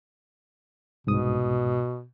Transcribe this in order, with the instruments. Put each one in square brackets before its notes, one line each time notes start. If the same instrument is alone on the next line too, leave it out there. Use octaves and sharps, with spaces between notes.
[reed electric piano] C2 G#2 D#6 [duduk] B2